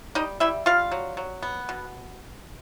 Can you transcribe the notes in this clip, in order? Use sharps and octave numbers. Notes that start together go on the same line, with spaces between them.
G3 D#4 D#5
G3 E4 E5
G3 F4 F5
F#3
F#3
B3
B2